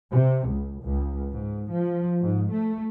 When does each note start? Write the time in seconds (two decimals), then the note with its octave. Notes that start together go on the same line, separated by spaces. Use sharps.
0.11 C3
0.48 C#2
0.82 C#2
1.29 G#2
1.70 F3
2.20 G#2
2.49 A3